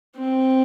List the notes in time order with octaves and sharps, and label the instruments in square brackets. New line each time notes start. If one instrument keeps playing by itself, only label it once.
[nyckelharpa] C4